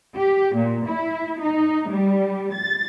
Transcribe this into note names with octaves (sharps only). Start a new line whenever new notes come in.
G4
A#2
E4
D#4
G3
A6